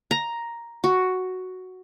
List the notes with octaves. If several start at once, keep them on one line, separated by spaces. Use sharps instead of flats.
A#5
F#4